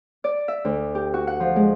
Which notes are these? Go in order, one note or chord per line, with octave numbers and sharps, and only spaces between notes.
D5
E5
D2
G4
F#4
F#5
F3
G#3